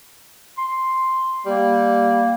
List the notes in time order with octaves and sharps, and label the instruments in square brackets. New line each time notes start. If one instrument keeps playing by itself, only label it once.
[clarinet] C6
[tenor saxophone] G3 [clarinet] A#3